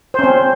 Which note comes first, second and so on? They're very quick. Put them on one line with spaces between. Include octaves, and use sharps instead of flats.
C5 C#4 C4